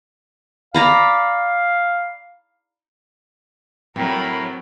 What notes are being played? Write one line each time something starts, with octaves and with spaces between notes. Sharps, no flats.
D5 F5 A#5 B5
A2 F#3 C4 A#4 B5